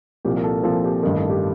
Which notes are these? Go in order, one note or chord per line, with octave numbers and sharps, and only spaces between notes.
C2 A#2 F3 G4
A#4
A4
C2 A#2 F3 A4
G4
A1 G2 D#3 A4
A4
G4